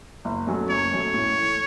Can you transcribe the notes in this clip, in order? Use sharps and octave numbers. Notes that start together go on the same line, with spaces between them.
F#1
F#2 F#3 A3 C#4
F#1 C#5
F#2 F#3 A3 C#4
A2
E3 A3